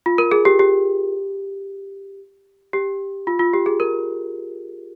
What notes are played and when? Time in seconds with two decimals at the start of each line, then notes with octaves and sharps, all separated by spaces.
0.06 F4
0.18 A#4
0.31 G#4
0.45 G4
0.59 G4
2.73 G4
3.27 F4
3.39 F4
3.54 G4
3.66 G#4
3.80 A#4